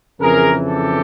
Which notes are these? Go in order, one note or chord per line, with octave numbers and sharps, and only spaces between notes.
F2 C#3 E3 G#4 A#4
G4 A4